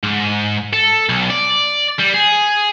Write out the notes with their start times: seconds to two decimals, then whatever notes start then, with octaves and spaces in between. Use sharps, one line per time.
0.03 G#2
0.73 A4
1.09 B1
1.30 D5
1.99 G3
2.14 G#4